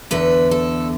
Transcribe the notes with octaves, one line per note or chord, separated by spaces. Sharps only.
E2 D3 B4
A4